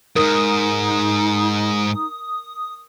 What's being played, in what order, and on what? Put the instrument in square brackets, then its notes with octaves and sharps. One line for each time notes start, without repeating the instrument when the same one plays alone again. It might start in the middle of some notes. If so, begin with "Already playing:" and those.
[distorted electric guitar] F2 G#2 [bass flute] D#4 [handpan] A#4 [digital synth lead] D#6